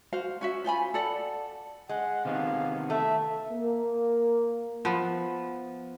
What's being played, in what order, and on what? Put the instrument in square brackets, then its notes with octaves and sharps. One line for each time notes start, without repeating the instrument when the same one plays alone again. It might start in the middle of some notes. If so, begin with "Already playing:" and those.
[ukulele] F#4 C5 F5
C#4 F#4 E5
F4 C5 G#5 B5
A4 D5 F#5
[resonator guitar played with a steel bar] G#3 [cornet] F#5
[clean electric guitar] C3 D#3 B3 [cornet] F5
[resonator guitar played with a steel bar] A3 [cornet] E5
[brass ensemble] A#3
[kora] F3 B3